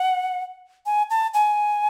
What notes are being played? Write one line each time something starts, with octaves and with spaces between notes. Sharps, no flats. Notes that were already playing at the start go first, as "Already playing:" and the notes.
Already playing: F#5
G#5
A5
G#5